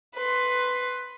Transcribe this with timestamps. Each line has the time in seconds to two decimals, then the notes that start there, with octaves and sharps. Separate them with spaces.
0.15 B4 C6